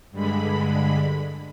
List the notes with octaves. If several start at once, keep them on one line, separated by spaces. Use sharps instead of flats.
G2 D3 G#3 B5